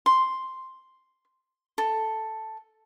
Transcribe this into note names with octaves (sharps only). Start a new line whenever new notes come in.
C6
A4